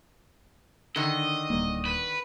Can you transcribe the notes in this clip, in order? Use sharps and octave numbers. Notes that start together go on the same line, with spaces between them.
D3 D#3 D#5 D#6
D1 G3 A#3
B4